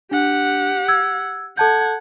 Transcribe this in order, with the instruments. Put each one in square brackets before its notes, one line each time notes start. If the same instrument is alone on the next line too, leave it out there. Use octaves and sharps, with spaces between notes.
[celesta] D4 [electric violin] G4 F#5
[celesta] E6 G#6
[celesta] A4 A5 G6 [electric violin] F#5 G#6